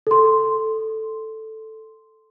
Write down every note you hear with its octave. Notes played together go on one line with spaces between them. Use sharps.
A4 C6